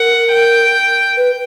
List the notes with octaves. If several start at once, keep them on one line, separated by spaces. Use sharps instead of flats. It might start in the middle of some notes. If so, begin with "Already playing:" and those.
Already playing: A#4 F#5
G5
B4